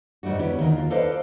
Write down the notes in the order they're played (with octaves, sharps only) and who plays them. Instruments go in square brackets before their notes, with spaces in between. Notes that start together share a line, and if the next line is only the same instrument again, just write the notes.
[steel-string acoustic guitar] G#2 G3 A3 D4 F#4
B3 C#4 D4 E4
D#2 D#3 F#4 A#4
F4
A4 B4 C5 D5 D#5 F5